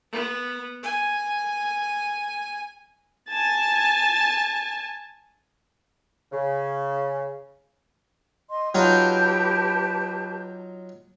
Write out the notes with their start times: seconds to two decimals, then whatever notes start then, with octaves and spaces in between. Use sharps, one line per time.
0.12 B3
0.83 G#5
3.29 G#5 A5
6.32 C#3
8.50 D#5 C6
8.75 F#3 D#4 F4 G4 B4 A5